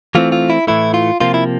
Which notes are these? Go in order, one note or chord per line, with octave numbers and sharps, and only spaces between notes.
E3 A3 C4 F4
F4
E4
A2 E3 A3 E4
F4
C3 F3 A#3 F4
E4